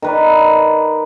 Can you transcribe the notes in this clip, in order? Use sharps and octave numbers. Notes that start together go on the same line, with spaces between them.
D#3 B4 D5